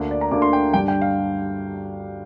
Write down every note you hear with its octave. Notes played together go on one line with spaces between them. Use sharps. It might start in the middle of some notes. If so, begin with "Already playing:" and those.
Already playing: D2 D3 A#3 D4
D5
A#5
D2 D3 A#3 D4 D6
C6
G5
G2 D3 G3 D4 G5
G5
F5